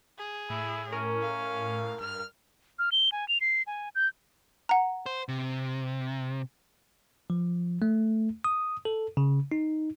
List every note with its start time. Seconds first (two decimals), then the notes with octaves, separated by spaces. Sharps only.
0.18 G#4
0.50 A2 E4
0.92 C#4 A#4
1.22 F5
2.00 G2 F6
2.79 F6
2.92 G7
3.12 G#5
3.28 F7
3.41 C7
3.67 G#5
3.95 G6
4.69 F#5 A#5
5.06 C5
5.28 C3
7.30 F3
7.82 A3
8.44 D#6
8.85 A4
9.17 C#3
9.52 D#4